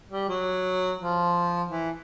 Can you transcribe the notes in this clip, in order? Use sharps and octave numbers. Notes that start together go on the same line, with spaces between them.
G3
F#3
F3
E3